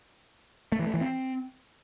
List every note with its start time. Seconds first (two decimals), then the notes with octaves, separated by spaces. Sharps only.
0.72 A3
0.79 E3
0.87 A3
0.94 E3
1.01 C4